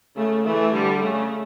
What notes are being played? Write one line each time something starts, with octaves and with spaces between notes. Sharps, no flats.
C#3 A3
E3 A3
D3 G3
C#3 A3